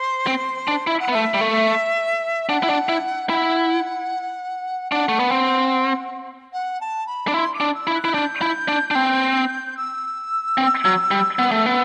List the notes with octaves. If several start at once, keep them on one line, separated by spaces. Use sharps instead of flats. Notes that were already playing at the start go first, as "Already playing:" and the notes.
Already playing: C5
C4
D4
E4 E5
F#5
B3
A3 E5
G3
A3
D4 F#5
E4
D4
E4
E4 F#5 G5
D4 F#5
A3
B3
C4
F#5
A5
B5
D4
E4 C6
D6
D4
E6
E4
F#6
E4
D4 G6
E4
D4
D4
C4
E6
C4
F#3
G3
B3
A3
B3